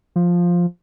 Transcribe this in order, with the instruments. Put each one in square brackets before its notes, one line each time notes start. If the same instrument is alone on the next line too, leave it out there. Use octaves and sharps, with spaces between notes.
[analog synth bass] F3